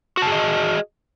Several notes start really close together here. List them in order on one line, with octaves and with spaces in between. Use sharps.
F#4 A5 G#4 D#5